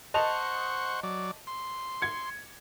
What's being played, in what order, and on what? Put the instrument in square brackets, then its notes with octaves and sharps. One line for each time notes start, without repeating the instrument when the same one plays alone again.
[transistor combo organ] C5 F#5 C#6 [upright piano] D#5 A5 F7
[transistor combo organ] F#3 D5
C6
[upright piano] G#6 C#7